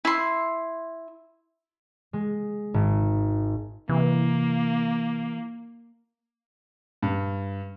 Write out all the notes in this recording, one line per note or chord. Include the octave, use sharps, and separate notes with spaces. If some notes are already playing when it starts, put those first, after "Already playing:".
E4 C6
G#3
G#1
C3 E3 A#3
G2